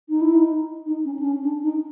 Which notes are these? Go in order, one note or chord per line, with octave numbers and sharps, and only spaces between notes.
D#4
E4
D#4
D#4
C#4
D4
C#4
D4
D#4